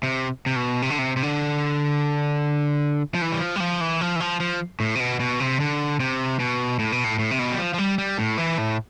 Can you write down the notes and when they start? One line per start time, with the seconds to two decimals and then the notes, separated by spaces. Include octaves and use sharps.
0.03 C3
0.46 C3
0.56 B2
0.82 C3
0.90 D3
0.99 C3
1.17 C3
1.23 D3
3.14 F3
3.22 E3
3.32 G3
3.40 F3
3.56 G3
3.60 F3
3.81 E3
4.01 F3
4.16 E3
4.20 F3
4.40 F3
4.80 A2
4.95 C3
5.00 B2
5.20 B2
5.40 C3
5.60 D3
6.00 C3
6.40 B2
6.79 A2
6.92 B2
7.04 A2
7.19 A2
7.31 C3
7.39 B2
7.52 G3
7.58 F3
7.74 F3
7.78 G3
7.98 G3
8.18 A2
8.38 E3
8.58 A2